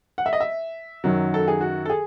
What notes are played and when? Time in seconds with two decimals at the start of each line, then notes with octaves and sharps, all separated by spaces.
0.18 F#5
0.26 E5
0.33 D#5
0.40 E5
1.04 F#2 D#3 F#3
1.34 A4
1.48 G#4
1.61 F#4
1.86 A4
1.90 G#4